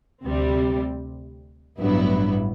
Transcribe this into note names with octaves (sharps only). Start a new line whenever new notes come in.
D2 C3 G3 C4
A1 G2 F#3 B3 E4